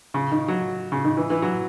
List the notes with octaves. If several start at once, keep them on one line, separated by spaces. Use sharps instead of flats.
C#3
D#3
F#3
C#3
D#3
E3
E3
F#3